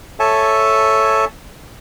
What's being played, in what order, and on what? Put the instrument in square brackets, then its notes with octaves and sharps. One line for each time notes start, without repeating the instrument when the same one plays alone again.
[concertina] A4 C#5 E5 G#5 A5